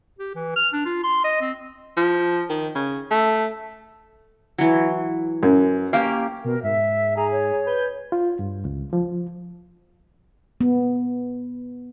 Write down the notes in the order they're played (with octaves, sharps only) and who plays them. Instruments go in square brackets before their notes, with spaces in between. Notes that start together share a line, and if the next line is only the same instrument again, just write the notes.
[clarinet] G4
E3
F6
D4
F4
C6
D#5
C4
[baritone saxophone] F3
D#3
C#3
A3
[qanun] E3 F#3
[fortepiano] F#2
[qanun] A#3 C#4 G4 [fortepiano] F5
[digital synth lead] B2 [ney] A#4
[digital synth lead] G#2 [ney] E5
[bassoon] G#4 [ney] A#5
[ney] C#5
[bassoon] B4 [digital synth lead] G6
[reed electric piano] F4
G2
C#2
F3
[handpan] B3